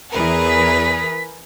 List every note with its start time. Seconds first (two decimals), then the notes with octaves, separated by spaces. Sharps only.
0.12 E2 E3 G#4 A#4 B4
0.48 B6